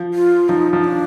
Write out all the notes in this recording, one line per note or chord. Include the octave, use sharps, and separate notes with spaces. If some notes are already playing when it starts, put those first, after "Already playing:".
Already playing: F3
F4
F3 D#4
F3
D4